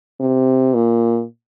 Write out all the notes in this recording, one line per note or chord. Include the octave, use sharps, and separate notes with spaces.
C3
A#2